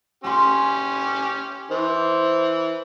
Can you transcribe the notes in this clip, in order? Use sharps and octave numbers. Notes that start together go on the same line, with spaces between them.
C#4 G4 G#5 C6
E3 C5